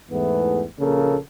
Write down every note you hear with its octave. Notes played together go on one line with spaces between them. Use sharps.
E2 G#2 E3 A3 B3
A#1 C#3 A#3 A4 A#4